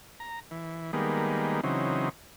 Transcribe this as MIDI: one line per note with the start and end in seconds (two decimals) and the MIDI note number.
0.20 0.40 82
0.51 0.91 52
0.93 1.61 51
0.93 1.61 55
0.93 1.61 56
0.93 1.61 58
0.93 1.61 59
1.64 2.09 49
1.64 2.09 52
1.64 2.09 54
1.64 2.09 60
1.64 2.09 63